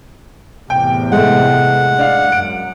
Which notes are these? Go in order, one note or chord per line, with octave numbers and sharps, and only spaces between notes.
E2 A2 C3 G5
G#3 A3 F#5
D4 F5
F#2 D7